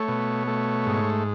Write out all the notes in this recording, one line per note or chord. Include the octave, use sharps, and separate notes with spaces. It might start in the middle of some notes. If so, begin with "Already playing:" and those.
Already playing: A3 C#5
B2
A3
G#2